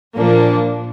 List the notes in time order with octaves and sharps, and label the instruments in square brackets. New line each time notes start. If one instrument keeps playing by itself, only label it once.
[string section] A#1 A#2 F3 A#3 D4